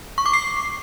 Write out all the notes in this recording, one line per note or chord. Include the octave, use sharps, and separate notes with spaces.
C#6
D6
C7